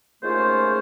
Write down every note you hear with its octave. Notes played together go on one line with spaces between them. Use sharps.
D#2 G#3 A3 C#4 F4 C5